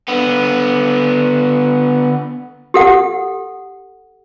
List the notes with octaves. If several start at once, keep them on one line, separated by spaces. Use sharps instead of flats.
D3 B3
G4 A4 F#5